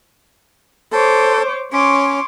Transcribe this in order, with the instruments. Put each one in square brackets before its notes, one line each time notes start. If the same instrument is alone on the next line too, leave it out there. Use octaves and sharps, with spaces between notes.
[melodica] A4 [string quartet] C5 C#5 D6
[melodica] C#4 [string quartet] C#5 C6 D6